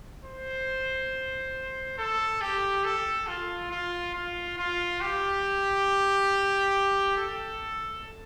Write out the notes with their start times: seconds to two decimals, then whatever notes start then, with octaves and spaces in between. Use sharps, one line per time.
0.25 C5
1.98 A4
2.41 G4
2.84 A4
3.27 F4
3.71 F4
4.14 F4
4.58 F4
5.01 G4
7.17 A4